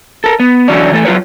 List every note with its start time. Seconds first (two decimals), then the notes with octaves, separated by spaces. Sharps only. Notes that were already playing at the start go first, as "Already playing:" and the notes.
0.24 A4 A#4
0.40 B3
0.68 D3 E3 F#3 C#4 C#5 D5
0.91 E3 A3 A4
1.05 F#3 F4 B4 C#5